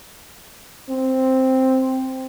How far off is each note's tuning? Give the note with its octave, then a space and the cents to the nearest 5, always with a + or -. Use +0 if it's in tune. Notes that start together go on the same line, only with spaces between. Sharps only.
C4 +0